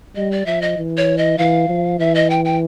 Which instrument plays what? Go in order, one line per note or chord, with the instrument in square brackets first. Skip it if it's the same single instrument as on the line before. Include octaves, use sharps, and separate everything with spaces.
[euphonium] G3 [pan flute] D#5
[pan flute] D5
[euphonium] F3 [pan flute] E5
[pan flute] D#5
[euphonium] E3
[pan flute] C#5
D#5
[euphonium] E3 [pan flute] F5
[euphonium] F3
[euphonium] E3 [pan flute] E5
[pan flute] D#5
G5
G5